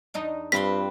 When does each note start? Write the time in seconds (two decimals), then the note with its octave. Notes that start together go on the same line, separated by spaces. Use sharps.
0.14 E2 D4 D#4
0.52 G2 C4 F4 B4 C6 B6